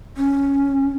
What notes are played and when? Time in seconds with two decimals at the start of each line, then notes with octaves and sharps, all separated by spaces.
0.17 C#4